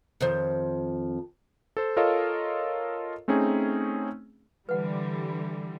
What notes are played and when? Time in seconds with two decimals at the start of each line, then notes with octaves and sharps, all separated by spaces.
0.21 F2 D#3 C5
1.77 A4 C5
1.97 F4 A4 A#4 C#5 D#5 F5
3.28 A3 C4 C#4 D#4 G#4
4.69 D3 E3 G3 B4 F#5